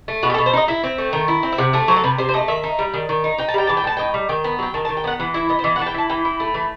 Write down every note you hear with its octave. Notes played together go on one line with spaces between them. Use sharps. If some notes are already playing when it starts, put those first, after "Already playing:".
A3
B2 F#4
G4
A4
B2
C5
D#4 D#5
E4 E5
C4
A3
D#3
E4
C4
E5
C3 F#5
A3 E5
F#3 C5
A4
C3 B4
C3 C5
C5
A3 D#5
D#3 E5
D#4
G3
D#3
D#3
D#4
D#4 G5
A5
G3 G5
E3 A5
G5
A2 A5
D#4 G5
G3
D#3 G5
B3
F#3 G5
D#3 A5
A5
D#3
G5
B3 F#5
E3 F#5
E4 E5
B3 D#5
C5
E3 D#5
F#5
E3 A5
G5
E4 A5
E3 G5
E4
A3
E3